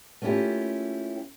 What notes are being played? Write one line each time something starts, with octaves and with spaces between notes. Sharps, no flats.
A3 A#3 C#4 E4 F4 G4